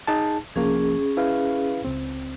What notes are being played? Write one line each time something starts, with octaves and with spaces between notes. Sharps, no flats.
D#4 G#4 A5
C2 F3 A#3 C#4 G#4
E4 B4 F5
C#2 C4